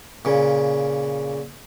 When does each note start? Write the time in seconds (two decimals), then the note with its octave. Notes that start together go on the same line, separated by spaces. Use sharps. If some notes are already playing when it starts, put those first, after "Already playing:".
0.25 A#2 C#3